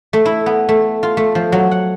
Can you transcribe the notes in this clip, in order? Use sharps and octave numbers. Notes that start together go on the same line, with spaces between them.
A3
E4
B3
A3
F4
A3
F3
F#3
F#5